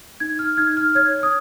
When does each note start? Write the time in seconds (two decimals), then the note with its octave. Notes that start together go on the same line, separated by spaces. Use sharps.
0.20 D#4 G#6
0.39 F6
0.57 D#4 G#6
0.77 F6
0.95 C#5 G#6
1.23 D#6